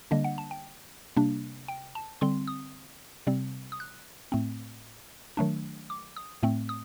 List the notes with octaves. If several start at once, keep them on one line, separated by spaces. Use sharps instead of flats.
D3 G3 A#3 D4 D#5
F#5
A5
G5
C3 G3 A#3 D4
G5
A5
D3 G3 C4 C6
D#6
C3 G3 C4
D#6
F#6
A2 A3 C4
D#3 F#3 A3 D4
D6
D#6
A2 A3 C4
D#6